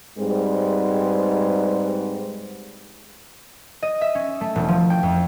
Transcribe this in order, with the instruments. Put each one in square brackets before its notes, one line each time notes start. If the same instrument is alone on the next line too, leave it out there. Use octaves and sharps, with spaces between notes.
[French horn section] G#2 G3 G#3 C4 B4
[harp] D#5
E5
C#4
A3
E1
F3
G5
F2